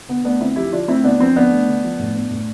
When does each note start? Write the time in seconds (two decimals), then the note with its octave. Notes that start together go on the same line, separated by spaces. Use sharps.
0.08 D3 B3
0.25 A3 B3 D4
0.41 D3 C4 E4
0.56 F3 E4 G4
0.72 D3 D4 F4
0.88 A3 C4 E4
1.04 D3 B3 D4
1.20 F3 C4
1.36 D3 B3 D4
1.52 A3
1.68 D3
1.84 F3
1.99 A2
2.15 B3
2.31 A2